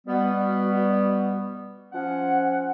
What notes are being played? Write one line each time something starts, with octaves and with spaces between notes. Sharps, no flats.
B2 G3 B3 F#4
F3 C#4 F#5